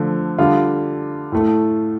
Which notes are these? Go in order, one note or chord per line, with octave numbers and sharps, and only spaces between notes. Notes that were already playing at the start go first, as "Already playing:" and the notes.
Already playing: D3 F3 A3
D3 G3 F4
A2 A3